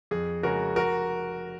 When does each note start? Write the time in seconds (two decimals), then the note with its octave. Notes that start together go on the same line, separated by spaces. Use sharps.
0.11 F2 G#4
0.43 C#3 G#3 F#4 A#4
0.76 F1 F#4 A#4